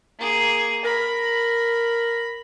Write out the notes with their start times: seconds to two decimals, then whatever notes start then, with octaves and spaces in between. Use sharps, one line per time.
0.19 A#3 G#4
0.85 A#4 B5